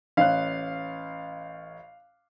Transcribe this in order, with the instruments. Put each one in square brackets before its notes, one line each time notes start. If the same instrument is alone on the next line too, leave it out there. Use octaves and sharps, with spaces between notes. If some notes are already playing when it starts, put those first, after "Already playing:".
[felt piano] A1 C#5 F#6 [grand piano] F5